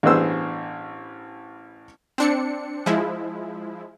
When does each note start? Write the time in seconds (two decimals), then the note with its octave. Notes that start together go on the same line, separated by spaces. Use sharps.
0.03 A1 G2 B3 G#4 C5 E6
2.18 C4 D4 C#7
2.86 F3 G#3 E4